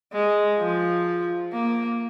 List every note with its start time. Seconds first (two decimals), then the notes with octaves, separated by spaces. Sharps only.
0.13 G#3
0.59 F3
1.52 A#3